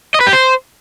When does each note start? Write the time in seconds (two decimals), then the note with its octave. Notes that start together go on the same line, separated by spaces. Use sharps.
0.14 D#5
0.21 B4
0.27 G4
0.33 C5